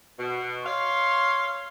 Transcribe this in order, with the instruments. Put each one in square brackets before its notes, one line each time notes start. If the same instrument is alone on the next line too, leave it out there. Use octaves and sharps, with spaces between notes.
[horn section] B2
[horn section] C#5 F5 [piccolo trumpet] C6